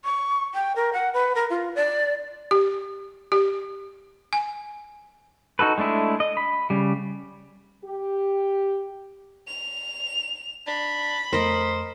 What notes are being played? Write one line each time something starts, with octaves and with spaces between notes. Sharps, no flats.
C#6
G5
A#4
F#5
B4
A#4
F4
D5
G4
G4
G#5
D#4 F#4 A4 B4
G#3 A3 D4 E4 G#4
D#5
B5
C#3 G3
G4
F7
D4 B5
F2 A3 A#4 C5 D#5